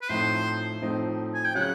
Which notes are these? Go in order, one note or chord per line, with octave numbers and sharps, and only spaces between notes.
B4
A2 F3 A3 C4 D#4 C5
A2 F3 A3 C4 D#4
G#5
G5
C#3 F#3 F#5